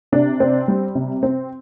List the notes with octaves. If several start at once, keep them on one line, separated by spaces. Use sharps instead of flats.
C3 D4
C4
G3
C3
C4